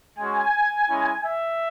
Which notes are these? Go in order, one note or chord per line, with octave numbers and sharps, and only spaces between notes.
G#3 C#4 F#4 G#5
G#3 C#4 E4
E5